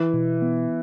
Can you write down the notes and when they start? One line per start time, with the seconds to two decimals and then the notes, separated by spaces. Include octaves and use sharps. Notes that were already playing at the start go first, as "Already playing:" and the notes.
Already playing: E3
0.13 B2
0.42 B3